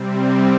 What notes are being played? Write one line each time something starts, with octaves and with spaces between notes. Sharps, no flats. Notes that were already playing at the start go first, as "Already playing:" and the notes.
Already playing: C3 G3 C4